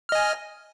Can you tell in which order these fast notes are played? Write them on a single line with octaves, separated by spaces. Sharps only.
F6 D#5 G#5